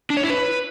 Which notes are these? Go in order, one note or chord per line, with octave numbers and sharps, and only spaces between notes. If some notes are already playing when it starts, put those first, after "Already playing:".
D4
C#5
E4
B4